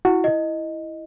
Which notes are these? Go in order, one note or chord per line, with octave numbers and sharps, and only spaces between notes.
E4 F#4
D#5